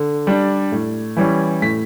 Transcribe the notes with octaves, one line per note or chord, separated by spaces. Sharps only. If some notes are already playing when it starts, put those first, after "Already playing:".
Already playing: D3
G3 D4
A2
E3 G3 C#4
A2 B6